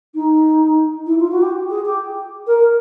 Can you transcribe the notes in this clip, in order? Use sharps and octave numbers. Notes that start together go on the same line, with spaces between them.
D#4
E4
F4
F#4
G4
G#4
G4
A#4